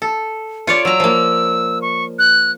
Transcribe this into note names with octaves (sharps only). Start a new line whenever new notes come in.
A4
F4 C#5 D5 C#7
F#3 A#5 E6
F3 A#3
C#6
F#6